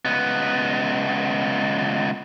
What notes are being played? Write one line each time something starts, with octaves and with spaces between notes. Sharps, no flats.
C#2 B3